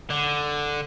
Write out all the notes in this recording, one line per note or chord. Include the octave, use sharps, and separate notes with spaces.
D3